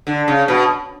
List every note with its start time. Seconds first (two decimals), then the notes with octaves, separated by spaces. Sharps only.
0.07 D3
0.28 C#3
0.48 B2